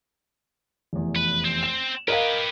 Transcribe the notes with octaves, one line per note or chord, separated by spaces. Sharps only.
F1 E2
B4
C4
E7
G4 A#4 B4 D#5 F5